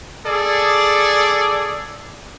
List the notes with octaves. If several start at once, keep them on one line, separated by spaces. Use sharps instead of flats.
G#4 A4 D5